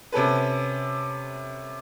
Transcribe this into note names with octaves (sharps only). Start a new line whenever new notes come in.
C3 C#4 A4 B4